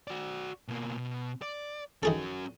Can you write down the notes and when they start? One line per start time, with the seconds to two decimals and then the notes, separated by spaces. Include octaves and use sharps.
0.08 F#4 D5
0.68 B2 A#3
0.98 B2
1.42 D5
2.03 D#3 C#4 F#4 G#4 A4